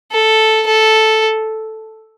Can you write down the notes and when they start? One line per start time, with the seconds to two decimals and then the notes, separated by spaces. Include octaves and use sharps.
0.12 A4
0.67 A4